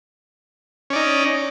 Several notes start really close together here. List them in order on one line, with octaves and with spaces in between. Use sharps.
C#4 D5 D#4